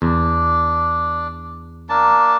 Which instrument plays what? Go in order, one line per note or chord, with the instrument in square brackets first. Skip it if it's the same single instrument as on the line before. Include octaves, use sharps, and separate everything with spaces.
[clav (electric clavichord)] E2 [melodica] D4
[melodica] A#3 D4 A5